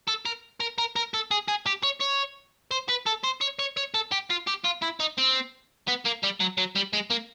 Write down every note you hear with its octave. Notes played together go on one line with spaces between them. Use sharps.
A4
A#4
A#4
A#4
A#4
A4
G#4
G#4
G4
C#5
C#5
C5
B4
A4
C5
C#5
C#5
C#5
A4
G4
F4
G4
F4
E4
D#4
C4
B3
A#3
G3
F#3
F#3
G3
G#3
A#3